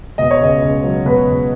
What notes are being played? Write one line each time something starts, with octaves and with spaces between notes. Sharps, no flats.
B2 D#5
C#5
C#2 D#5
C#2
F#3
B2 B4
C#2